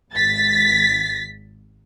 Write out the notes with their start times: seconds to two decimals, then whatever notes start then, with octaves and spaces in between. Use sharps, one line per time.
0.12 G#1 A6 B6